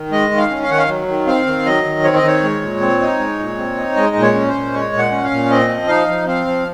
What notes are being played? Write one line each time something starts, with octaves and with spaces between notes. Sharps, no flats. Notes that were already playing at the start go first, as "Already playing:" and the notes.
Already playing: D#3
G#3 D#5
D#3
F5
C#4
F5
D#3 F#5
F5
F#3
D#3
C4 F5
D#3
F#3 D#5
D#3
C4 C#5
D#5
D#3 C#5
G#3
A#2
C4
D#4
G#3
A#2
C4
D#4
G#3 D#5
A#2
C#5
C#4
C5
A#2
G#3 C#5
A#2
F#5
C#4
F5
A#2
C4 D#5
F3
D#4 F5
F3
C4 F5
F3